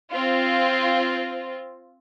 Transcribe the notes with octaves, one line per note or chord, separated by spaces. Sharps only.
C4 F4